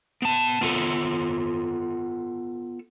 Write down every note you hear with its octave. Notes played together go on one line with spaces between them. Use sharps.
B3 A5
B3 F4 A4